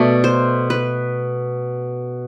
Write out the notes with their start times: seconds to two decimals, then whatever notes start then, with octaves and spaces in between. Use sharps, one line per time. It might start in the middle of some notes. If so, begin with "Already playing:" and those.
Already playing: B2 A3 D5
0.24 C5
0.70 B4